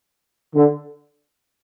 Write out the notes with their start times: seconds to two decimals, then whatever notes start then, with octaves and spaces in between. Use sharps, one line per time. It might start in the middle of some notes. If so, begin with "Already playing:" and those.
0.55 D3